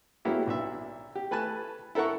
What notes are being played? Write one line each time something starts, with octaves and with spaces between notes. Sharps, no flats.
F#3 G#3 A#3 B3 E4 G4
B1 D4 E5
G4
A3 B4 G#5 A5 F#6
E4 A4 A#4 F#5 C#6